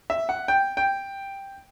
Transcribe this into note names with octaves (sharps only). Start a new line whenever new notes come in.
E5
F#5
G5
G5